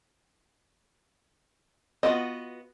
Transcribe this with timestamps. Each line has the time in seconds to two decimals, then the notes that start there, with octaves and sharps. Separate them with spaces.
2.03 B3 F4 F#4 A4 D#5